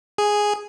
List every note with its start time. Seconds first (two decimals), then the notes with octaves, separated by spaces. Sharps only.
0.18 G#4